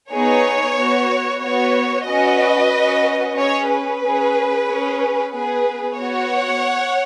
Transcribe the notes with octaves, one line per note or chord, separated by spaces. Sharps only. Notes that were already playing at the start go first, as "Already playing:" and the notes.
B3 D#4 G#4 C#5
B3 F#4
B3 F#4 C#5
C#4 F#4 B4 D#5
C#4 F#4
C#4 G#4 C#5
B4
C#4 G#4
C#4 G#4
B3 G#4 B4
B3 F#4 C#5 F#5